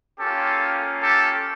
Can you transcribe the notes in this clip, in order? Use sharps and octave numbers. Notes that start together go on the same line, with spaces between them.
A#3 C#4 F4 G4 A4
G4 A4